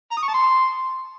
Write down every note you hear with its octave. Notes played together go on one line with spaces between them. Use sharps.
A#5
D#6
C#6
A5
C6